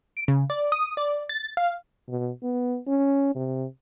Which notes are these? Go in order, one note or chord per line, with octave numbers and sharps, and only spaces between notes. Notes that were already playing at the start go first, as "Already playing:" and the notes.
D7
C#3
D5
D#6
D5
A6
F5
B2
B3
C#4
C3